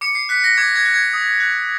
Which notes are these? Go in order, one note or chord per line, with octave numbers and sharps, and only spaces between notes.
D6 C#7
C7
F#6 B6
A#6
D6 G#6
G#6
F#6
G#6
D#6
F#6